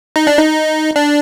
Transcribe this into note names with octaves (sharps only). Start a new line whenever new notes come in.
D#4
D4
D#4
D4